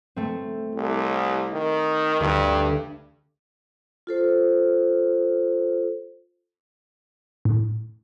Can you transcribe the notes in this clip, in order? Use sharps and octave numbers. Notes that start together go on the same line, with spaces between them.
A3 C4
C2
D#3
D2 G2
F4 A4 C5
A2